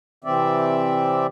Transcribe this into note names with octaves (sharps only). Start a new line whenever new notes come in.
C3 E3 C4 D5 E5